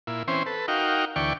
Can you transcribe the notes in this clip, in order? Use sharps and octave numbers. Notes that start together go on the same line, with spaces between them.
A#2 E4
E3 C4 C#4 C5
A4 B4
D#4 F#4 A#4 F5 G5
D2 E3 D5 G5 C#6